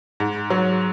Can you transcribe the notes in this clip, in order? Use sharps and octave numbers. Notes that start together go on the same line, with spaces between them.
G#2
F#3